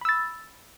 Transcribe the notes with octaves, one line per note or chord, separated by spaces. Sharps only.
B5 E6 A6